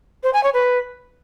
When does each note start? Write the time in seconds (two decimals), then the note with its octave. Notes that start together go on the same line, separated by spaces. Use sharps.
0.23 C5
0.33 G#5
0.43 C#5
0.54 B4